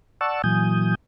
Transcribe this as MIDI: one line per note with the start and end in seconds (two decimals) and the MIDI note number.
0.21 0.42 74
0.21 0.42 78
0.21 0.42 81
0.21 0.42 85
0.21 0.42 88
0.44 0.95 46
0.44 0.95 52
0.44 0.95 54
0.44 0.95 80
0.44 0.95 87
0.44 0.95 91